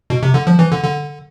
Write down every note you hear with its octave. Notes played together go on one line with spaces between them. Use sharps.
B2
C3
D3
F3
E3
D3
D3